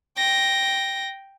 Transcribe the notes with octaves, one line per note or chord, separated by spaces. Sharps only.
G5 A#6